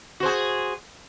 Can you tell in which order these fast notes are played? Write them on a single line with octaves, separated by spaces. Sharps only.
F#4 C5 G#4